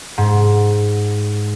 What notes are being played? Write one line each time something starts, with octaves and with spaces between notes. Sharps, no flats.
G#2